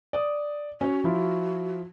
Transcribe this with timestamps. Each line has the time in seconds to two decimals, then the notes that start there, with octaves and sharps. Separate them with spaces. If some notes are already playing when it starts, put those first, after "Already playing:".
0.13 D5 D#6
0.81 C#4 F#4 C#5
1.04 F3 E4 F4